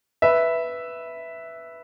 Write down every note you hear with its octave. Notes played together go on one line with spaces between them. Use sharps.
B4 E5